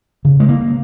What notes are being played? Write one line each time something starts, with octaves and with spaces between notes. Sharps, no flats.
C#3
G#3
A#3